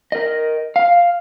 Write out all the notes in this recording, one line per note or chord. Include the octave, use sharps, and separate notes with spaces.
A#4 D#5
F5